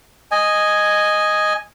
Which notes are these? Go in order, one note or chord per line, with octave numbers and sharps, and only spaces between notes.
D#5 G#5